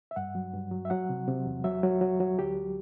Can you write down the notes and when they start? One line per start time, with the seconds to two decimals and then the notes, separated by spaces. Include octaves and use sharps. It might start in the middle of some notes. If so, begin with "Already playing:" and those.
0.11 E5
0.16 G2 F#5
0.35 F#3
0.53 G2
0.71 F#3
0.85 E5
0.90 F#3 F#5
1.09 C3
1.28 C3
1.46 E2
1.64 F#3 E5
1.83 F#3
2.01 F#3
2.20 F#3
2.39 D2 G4